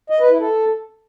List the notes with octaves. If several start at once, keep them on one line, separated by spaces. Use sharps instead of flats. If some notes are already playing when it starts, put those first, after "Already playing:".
D#5
B4
E4
A4